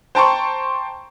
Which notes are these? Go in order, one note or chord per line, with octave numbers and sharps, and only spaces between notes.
C5 G5 A5 A#5 C6 C#6